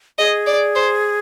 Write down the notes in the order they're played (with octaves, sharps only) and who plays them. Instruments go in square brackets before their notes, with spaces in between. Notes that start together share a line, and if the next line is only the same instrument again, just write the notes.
[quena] G#4 [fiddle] D#5
[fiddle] D5
C5